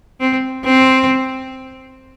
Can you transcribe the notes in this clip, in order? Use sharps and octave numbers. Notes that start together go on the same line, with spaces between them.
C4
C4